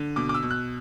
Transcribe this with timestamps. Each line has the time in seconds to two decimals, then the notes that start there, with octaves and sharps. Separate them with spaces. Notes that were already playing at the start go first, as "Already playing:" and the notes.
Already playing: D3
0.16 B2 D6
0.29 D6
0.34 E6
0.43 B2
0.51 F#6